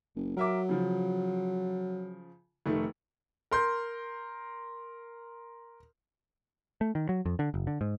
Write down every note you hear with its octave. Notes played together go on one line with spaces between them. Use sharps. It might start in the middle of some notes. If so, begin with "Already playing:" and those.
F#1
F#3 A#4 E5 D6
C#3 F3
F1 D#3 A3
A#4 C6 G6
A3
D#3
F#3
F2
D3
F#1
D3
G#2